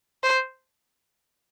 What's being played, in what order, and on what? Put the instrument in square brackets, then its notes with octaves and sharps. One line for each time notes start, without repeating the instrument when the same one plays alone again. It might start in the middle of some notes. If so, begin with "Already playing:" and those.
[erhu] C5